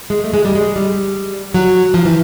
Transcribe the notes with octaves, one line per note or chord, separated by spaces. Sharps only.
G#3
A3
G#3
G3
G#3
G3
F#3
F3
E3